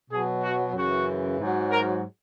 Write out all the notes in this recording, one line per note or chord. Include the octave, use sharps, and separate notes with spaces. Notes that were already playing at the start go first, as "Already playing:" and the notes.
B2 F#3 G#4
F#4
F#2 C#3 E3 F#4
G#2 F#3
A#4